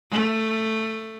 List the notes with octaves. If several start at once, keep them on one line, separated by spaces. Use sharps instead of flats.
A3